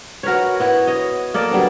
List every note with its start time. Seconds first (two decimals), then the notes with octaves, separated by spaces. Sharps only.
0.23 F#4 A#4 B4 C#5
0.60 B3 E4 F#4
0.87 C#5 D#5
1.34 A#3 A4 D5 D#5
1.51 F#3 G3 B3 D4